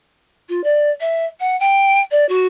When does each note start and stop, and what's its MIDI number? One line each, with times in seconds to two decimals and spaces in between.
0.49 0.61 65
0.63 0.90 74
1.00 1.25 76
1.39 1.58 78
1.59 2.00 79
2.11 2.27 74
2.28 2.47 66